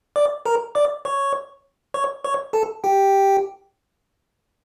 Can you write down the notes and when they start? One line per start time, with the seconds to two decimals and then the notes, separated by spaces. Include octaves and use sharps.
0.16 D5 D6
0.46 A#4 A#5
0.75 D5 D6
1.05 C#5 C#6
1.94 C#5 C#6
2.24 C#5 C#6
2.53 A4 A5
2.84 G4 G5